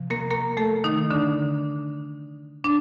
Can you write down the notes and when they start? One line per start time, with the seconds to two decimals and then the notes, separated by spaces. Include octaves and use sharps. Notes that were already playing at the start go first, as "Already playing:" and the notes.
Already playing: C3 F3
0.10 A#3 A#4
0.30 A#3 A#4
0.57 A3 A4
0.84 D#3 D#4
1.10 D3 D4
2.64 D4